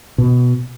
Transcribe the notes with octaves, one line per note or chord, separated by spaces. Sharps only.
B2